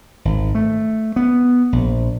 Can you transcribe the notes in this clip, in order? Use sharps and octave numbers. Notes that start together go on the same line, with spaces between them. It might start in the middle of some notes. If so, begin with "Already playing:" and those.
G#1
A3
B3
A#1